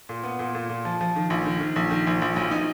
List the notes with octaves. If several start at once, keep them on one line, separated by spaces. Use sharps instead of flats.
A#2
B3
A#2
A#2
A#2
F3
F3
D#3
A#1
D#3
D#3
A#1
D#3
A#1
A#1
B1
D#4